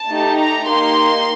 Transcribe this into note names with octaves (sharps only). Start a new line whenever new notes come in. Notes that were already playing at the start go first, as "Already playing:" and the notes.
Already playing: A5
A3 D#4 G4
A#5
A#3 D#4 G4 C6